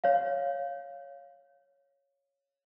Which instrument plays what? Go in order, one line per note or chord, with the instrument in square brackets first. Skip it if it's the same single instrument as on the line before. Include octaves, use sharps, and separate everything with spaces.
[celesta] C#5 F5